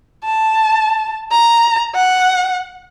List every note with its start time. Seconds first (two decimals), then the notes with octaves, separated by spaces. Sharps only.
0.24 A5
1.31 A#5
1.95 F#5